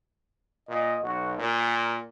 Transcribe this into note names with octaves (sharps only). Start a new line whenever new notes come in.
A#2 D#5
B1 F#4
A#2 A#4